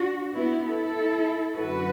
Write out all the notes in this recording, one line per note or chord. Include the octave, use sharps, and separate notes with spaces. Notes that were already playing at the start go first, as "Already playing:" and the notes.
Already playing: D4 F#4
B3 E4
E4 A4
F#2 D3 F#3 F#4 B4